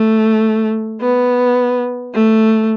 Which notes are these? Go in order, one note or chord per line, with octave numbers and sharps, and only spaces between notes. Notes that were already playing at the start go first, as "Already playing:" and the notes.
Already playing: A3
B3
A3